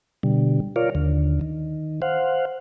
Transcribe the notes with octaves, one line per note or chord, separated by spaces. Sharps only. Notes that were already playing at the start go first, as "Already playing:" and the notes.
B2 D3 G3
F4 A#4 C#5 D5 F5
D#2 D3
D#3
C5 F5 F#5